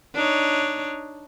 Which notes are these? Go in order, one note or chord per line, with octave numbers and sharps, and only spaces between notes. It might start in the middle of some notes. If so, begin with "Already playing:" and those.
D4 D#4 C#5